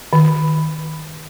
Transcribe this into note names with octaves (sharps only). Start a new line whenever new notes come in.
D#3